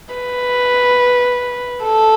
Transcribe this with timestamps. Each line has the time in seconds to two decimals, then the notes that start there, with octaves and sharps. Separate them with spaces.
0.14 B4
1.83 A4